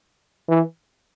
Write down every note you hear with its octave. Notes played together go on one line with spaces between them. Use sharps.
E3